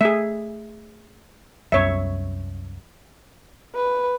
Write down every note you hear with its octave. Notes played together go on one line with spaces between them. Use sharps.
A3 G#4 E5
C2 F#2 C#5 E5
B4